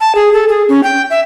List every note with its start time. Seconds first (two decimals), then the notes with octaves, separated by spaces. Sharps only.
0.01 A5
0.15 G#4
0.33 A4
0.48 G#4
0.69 C#4
0.83 G5
1.10 E5